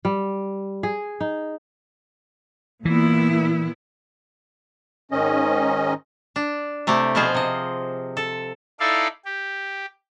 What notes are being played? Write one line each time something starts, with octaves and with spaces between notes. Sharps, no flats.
G3
G#4
D#4
A#2 E3 B3 E4
G#2 D#3 C#4 D#5
D4
C3 A3 E4 G4
B2 F3 B3 F4 G#4 C5
C3 D#5
A4
D#4 E4 A4 D5 E5 F5
G4